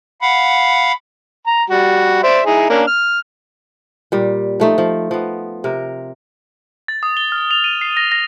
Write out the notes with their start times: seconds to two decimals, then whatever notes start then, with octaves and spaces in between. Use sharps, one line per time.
0.21 F5 F#5 B5
1.47 A#5
1.70 G3 F#4
2.23 C5 D5 E5
2.46 D#4 E4 G#4
2.70 A#3 C#4 D4
2.87 F6
4.12 A#2 G3
4.60 F3 A3 D#4
4.78 F3
5.11 F3 B3
5.64 C3 A#4
6.88 A6
7.03 D#6
7.17 G7
7.32 F6
7.51 F7
7.64 D#7
7.81 C7
7.97 A#6
8.12 A#6